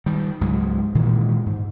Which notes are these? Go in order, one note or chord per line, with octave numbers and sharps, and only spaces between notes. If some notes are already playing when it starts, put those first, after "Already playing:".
D#3 G3
C#2 G#2 F#3 G#3
A#2 D#3 E3 G#3
G#2